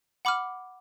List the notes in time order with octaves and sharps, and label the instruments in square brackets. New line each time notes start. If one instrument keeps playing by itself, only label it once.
[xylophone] F#5 B5 D6 F6